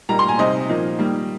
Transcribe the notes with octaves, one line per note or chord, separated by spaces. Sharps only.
A#2 G3 A#3 D#4 A#5
C6
G#5
C3 G3 C4 D#4 D#5
A#2 F3 A#3 D#4
D#3 G3 A#3